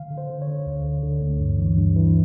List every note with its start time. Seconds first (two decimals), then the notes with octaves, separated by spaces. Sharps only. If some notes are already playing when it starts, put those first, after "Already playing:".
Already playing: D3 F5
0.11 D3
0.18 C5
0.30 D3
0.42 C#5
0.48 D3
0.66 D2
0.84 D3
1.03 D3
1.21 D2
1.40 G2
1.59 E3
1.77 G2
1.96 E3